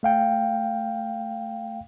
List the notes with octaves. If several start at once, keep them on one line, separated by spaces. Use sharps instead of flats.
A3 F5 G5